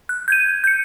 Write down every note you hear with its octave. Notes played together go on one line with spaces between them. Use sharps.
F#6
G6 G#6 D#7
G6 C#7